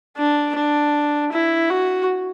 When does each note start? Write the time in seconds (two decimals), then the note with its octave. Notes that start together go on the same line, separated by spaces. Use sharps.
0.18 D4
0.56 D4
1.32 E4
1.70 F#4